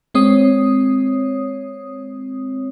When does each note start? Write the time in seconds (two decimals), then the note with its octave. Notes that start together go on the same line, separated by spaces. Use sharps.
0.14 G#3 C4 C#5 D#6